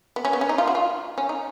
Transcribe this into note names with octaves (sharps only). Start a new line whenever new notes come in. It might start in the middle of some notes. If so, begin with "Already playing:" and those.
B3
C#4
B3
C#4
D#4
F4
F#4
F4
C#4
D#4